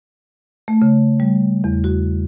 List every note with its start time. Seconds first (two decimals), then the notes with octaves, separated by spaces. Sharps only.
0.68 A3
0.82 C#3
1.20 G3
1.64 E2
1.84 F#4